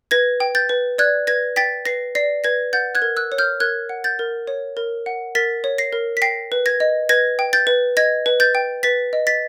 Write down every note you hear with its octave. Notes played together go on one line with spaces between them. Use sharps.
B4 G#6 A#6
G5
G6 A6
B4
D5 F#6 G#6
B4 G#6 A#6
G5 A6 B6
B4 A#6 C7
D5 A#6 C7
B4 G#6 A#6
F#5 G6 A6
F#6 G#6
A#4
E6 F#6
C#5
F6 G6
A#4 F#6 G#6
F#5
G6 A6
A#4
C#5
A#4
F#5
A#4 A6 B6
C#5
A#6 C7
A#4
B6
G5 A#6 C7
B4
G#6 A#6
D#5
B4 G#6 A#6
G5
G6 A6
B4
D#5 G#6 A#6
B4
G6 A6
G5
B4 A6 B6
D#5
A6 B6